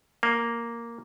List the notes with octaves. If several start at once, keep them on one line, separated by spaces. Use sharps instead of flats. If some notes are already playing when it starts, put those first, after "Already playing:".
A#3